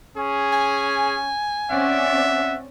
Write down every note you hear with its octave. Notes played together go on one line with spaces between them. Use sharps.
C#4 G#4
G#5
C4 C#4 D5 E5 F#5